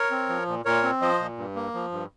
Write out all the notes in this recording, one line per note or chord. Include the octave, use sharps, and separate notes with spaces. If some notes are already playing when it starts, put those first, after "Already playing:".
Already playing: A#4 C#5
C4
F3
A#2
A#2 A#4 C#5
C4
F3 C5 D#5
A#2
G2
A#3
F3
G2